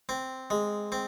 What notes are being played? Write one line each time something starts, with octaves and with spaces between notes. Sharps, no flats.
C4
G#3
C4